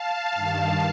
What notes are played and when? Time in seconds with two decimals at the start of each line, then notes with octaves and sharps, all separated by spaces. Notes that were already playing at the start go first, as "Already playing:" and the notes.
Already playing: F5 A5
0.34 G2 D#3